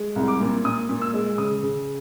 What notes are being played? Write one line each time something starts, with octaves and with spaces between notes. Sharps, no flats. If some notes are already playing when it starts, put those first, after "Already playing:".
Already playing: G#3
C2
D6
A#2
A#2 D#6
A#2
E6
G#3
C#3 D#6
C#3